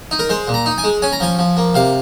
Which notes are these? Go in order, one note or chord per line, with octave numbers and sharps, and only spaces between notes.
D#4
A#4
G#3 C5
A#2
A#5
D#4
G#5
G#3
C#4 G#5
A#5
F3 G#5
F3
A#3
C3 F5